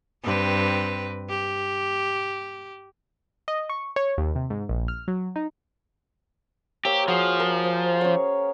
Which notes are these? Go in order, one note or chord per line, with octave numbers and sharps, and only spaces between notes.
G2 C4 B4
G4
D#5
C#6
C#5
D#2
C3
G#2
A#1
F6
F#3
D#4
A#3 G4 C#5 E6
F3 F#4 G#4
A#4
C5
C#4 C#5